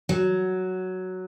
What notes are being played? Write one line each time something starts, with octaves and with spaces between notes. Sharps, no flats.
F#3